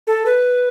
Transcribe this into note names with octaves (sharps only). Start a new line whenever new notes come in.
A4
B4